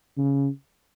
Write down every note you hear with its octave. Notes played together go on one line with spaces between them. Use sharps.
C#3